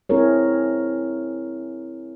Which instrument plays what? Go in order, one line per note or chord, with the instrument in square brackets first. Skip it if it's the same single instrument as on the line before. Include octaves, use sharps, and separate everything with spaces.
[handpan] C4 E4 G#4 A#4 C#5